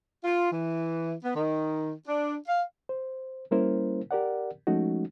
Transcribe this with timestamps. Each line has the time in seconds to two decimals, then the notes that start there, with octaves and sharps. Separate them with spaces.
0.24 F4
0.52 E3
1.23 B3
1.35 D#3
2.08 D4
2.48 F5
2.89 C5
3.51 G3 A#3 C#4 E4 A#4 C5
4.11 G4 A#4 D5 F#5
4.67 F3 G#3 A3 C#4 D#4 F#4